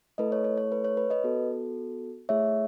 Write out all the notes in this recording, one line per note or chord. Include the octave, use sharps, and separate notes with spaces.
A3 E4 A4 B4 D#5
C#5
C#5
C#5
B4
C#5
B4
B4 D#5
B3 F#4 A4
A3 E4 G#4 C#5 E5